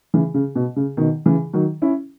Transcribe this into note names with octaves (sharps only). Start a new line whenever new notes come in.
C#3 E3
C#3
B2
C#3
B2 D#3
C#3 E3
D#3 F#3
C#4 E4